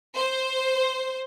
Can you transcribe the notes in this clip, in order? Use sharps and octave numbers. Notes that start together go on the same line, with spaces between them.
C5